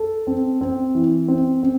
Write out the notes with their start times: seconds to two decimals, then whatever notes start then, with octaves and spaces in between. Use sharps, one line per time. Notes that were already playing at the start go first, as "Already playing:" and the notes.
Already playing: A4
0.27 C4
0.61 C4
0.95 E3
1.28 C4
1.63 C4